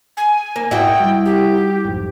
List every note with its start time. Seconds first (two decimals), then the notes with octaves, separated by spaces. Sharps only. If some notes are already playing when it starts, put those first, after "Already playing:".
0.17 G#5
0.56 A#3
0.71 G#2 E4 F#4 D#5 G5
1.00 G3
1.25 G4
1.85 B1 F2 G#2